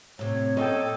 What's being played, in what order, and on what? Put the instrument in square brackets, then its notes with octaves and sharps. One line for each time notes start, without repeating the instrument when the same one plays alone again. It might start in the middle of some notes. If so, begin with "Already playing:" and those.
[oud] A2 C3 [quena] C#5
[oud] A#2 [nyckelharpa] A4 [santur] D#5 G5